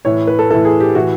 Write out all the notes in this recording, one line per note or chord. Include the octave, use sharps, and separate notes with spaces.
A2 E3 C#5
B4
A4
A2 E3 A4
G#4
G4
A2 E3 F#4